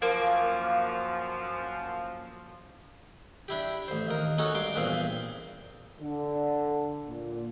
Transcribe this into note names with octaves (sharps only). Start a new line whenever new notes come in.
F#2 F3 A#3
D4 E4 G4
A1 C5
D#2 A#4
C#4 D#4 F#4 A4
G2 C6 D6
E2 G2 A#2 C4 F5
D3
A#2